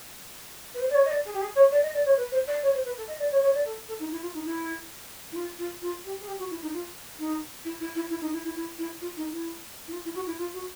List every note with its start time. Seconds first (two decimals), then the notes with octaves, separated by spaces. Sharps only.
0.74 B4
0.80 C5
0.90 D5
0.94 C#5
1.05 D#5
1.10 D5
1.25 G#4
1.33 G4
1.41 G#4
1.55 C#5
1.71 D5
1.82 D#5
1.94 D5
2.05 C#5
2.17 B4
2.31 C5
2.47 D5
2.62 C#5
2.74 C5
2.85 B4
2.97 A4
3.07 D#5
3.19 D5
3.31 C#5
3.42 C#5
3.54 D5
3.65 A4
3.88 A4
3.99 D#4
4.11 E4
4.21 F4
4.34 D#4
4.45 E4
5.32 E4
5.35 F4
5.58 F4
5.81 F4
6.05 G4
6.19 G#4
6.27 G4
6.39 F#4
6.50 E4
6.62 D#4
6.73 F4
7.19 D#4
7.64 E4
7.80 E4
7.95 E4
8.09 E4
8.21 D#4
8.32 E4
8.44 E4
8.56 E4
8.78 E4
9.01 F4
9.16 D#4
9.31 E4
9.87 E4
9.92 F4
10.04 E4
10.15 F#4
10.26 E4
10.38 F4
10.53 F#4